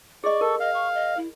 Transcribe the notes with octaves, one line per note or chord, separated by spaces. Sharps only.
G#4 D5 D#5 C#6
A4 A#4
D#5 F5
C#6
D#5
E4